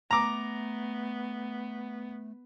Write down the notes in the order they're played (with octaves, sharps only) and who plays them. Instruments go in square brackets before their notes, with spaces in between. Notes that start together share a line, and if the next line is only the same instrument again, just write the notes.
[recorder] A3 [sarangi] B3 [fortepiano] A#5 D6